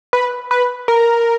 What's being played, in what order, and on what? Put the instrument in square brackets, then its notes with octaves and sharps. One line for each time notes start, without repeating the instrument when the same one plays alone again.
[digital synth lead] B4
B4
A#4